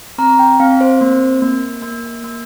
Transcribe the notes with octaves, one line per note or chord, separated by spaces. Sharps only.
C4 A#5
G5
C4 F5
C5
A#3
A#3
A#3
A#3